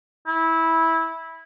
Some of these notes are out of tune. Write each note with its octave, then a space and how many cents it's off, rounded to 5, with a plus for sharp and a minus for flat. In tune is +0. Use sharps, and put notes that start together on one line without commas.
E4 -15